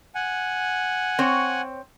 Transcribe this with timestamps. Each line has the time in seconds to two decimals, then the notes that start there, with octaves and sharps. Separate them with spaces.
0.15 F#5 G#5
1.19 C4 C#5